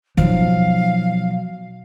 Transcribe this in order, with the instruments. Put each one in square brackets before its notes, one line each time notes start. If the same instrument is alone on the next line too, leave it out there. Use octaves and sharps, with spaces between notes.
[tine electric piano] B2 F#3 [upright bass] F3 D#4 [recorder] F5